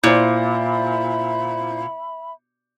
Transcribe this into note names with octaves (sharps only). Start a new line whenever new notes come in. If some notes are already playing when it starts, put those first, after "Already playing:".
A#2 E4 C5 E5 B5